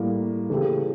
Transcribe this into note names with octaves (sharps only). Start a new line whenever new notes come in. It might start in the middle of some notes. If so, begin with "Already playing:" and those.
Already playing: A2 G3 A#3
C#3 E3 A3 E4 G4